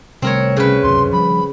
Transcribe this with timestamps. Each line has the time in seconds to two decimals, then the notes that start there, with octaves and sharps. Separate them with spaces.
0.22 C3 G3 A3 C4 A#4 C#5
0.57 C#3 B4
0.83 C#2 F#2 C3 C6
1.13 F3 G3 B5